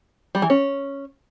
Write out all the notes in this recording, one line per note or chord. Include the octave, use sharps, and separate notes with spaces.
G3
E3
C#4